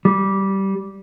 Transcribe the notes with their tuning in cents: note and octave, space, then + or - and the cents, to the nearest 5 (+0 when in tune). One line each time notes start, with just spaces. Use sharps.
G3 -15